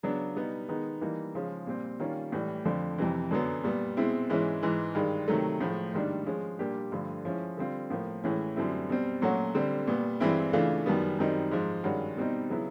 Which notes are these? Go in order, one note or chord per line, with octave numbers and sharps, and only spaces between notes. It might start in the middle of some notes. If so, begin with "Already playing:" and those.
C#3 F#3 B3 D4
B2 G3 B3 D#4
D#3 G#3 B3 D#4
E3 G3 A#3 D#4
C#3 F3 G#3 C#4
A#2 G3 C4
D#3 G3 A#3 C#4 F4
A2 E3 G3
F2 D3 F3
F2 C3 E3
F#2 D3 F#3 B3
A#2 G3 B3
B2 G#3 C4 E4
G#2 E3 G#3 C#4 E4
G#2 E3 G#3
G2 D#3 G#3
C3 D#3 F#3 A3
A2 F3 G#3
G#2 D#3 G3 A#3 D4
F3 G#3 C#4
A#2 G3 A#3 D4 G4
G2 D3 F3 A3
F3 G#3 C#4 E4
D3 G3 C4 F4
A2 F3 A#3
A2 E3 G#3 C#4 E4
F#2 D3 G3 C4 E4
B2 G3 C4
A#2 F#3 A3 C#4 F#4
D3 G3 C4
A#2 G3 B3
G2 E3 G#3 C4 E4
C#3 E3 A3 D4 F4
F#2 D#3 G3 B3
F#2 D#3 G3 C4 D#4
G#2 F3 G#3
G2 D#3 G#3 C#4 F#4
B2 G3 C4 D#4
C#3 F#3 B3 E4